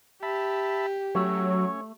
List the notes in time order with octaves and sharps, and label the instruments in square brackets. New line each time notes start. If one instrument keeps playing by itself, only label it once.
[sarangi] G4 [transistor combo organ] E5 A5 B5
[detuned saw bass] F#3 [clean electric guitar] A3 [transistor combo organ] C#4 C#5